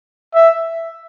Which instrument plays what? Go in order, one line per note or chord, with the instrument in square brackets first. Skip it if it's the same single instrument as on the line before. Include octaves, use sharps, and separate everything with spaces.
[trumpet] E5